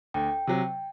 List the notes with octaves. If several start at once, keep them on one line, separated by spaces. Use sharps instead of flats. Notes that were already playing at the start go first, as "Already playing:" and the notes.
D2 G5
C3 F#3